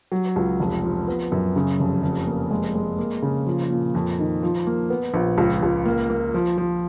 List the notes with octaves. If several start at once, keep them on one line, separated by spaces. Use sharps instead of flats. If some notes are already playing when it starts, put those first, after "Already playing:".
F#3
C#2
F1
F3
B3
F#2
C#3
F1
F1
A#3
G#3
G#3
A#3
C#3
F3
A#2
F2
D#3
F3
A#3
B3
A#1
C#2
C#2
A#3
A#3
F3
F3